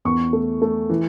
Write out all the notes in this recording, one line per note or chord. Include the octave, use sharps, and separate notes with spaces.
E2 C#6
A3
A3
E3